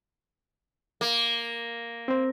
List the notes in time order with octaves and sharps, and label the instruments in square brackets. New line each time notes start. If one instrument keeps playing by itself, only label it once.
[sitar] A#3
[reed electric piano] C4 C5